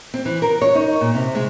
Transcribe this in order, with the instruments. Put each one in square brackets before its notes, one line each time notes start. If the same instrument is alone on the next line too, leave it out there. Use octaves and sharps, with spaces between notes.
[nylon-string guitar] C4
E3
A#4
C#5
D#4
A#2
C3
G#3